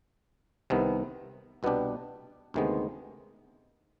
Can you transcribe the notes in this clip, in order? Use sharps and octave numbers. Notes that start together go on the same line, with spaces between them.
C2 C3 D#3 B3
C2 B2 B3 D4 G4
D2 C3 D#3 G#3 B3